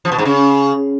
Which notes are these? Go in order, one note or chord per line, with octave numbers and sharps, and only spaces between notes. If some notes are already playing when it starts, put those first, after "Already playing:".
F3
B2
G#2
C#3